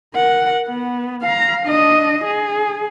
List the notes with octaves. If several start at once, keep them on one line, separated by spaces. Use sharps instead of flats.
A#4 F#5
B3
F5 A#5
D4 D#5
G#4